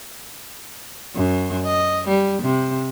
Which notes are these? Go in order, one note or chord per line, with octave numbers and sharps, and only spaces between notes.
F#2
D#5
G3
C3